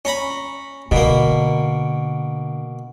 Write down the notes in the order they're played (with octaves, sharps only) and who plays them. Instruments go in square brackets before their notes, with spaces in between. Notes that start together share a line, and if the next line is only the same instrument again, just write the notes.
[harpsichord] C#4 A#5 B5
[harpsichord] B2 A#3 [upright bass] D3